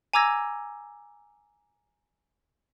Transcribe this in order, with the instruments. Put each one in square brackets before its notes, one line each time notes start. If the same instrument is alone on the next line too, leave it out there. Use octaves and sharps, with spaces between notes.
[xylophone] G#5 A#5 D6 E6 G#6 A#6